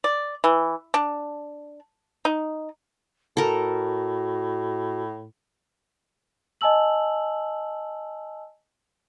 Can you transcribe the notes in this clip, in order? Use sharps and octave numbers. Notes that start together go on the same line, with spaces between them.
D5
E3
D4
D#4
A2 F#4 A4 A#4
D#5 G#5 A5 E6 F#7